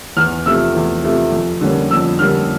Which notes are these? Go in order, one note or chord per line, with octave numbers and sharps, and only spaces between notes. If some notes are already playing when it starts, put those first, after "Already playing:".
E2 F6
C3 F3 A3 E6
E2
C3 F3 A3
F2
D3 G3 A#3 C#4
F2 E6
D3 G3 A#3 C#4 F6